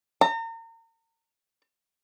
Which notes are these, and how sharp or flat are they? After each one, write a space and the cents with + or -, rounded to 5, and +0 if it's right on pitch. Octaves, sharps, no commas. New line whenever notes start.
A#5 -35